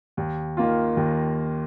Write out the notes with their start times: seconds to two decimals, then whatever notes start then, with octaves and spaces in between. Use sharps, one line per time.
0.17 D#2
0.57 D#3 A#3 F4
0.97 D#2